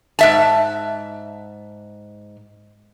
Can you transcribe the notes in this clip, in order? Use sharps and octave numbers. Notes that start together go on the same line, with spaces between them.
G#2 E5 A5